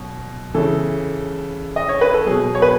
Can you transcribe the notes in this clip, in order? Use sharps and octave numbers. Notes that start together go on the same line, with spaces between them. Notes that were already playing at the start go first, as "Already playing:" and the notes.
Already playing: B2 F#3
C#3 E3 A4
D#5
C#5
B4
A4
B2 F#3 G#4
C#5
B4